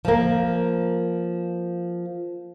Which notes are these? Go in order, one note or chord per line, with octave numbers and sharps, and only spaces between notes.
F3 A#3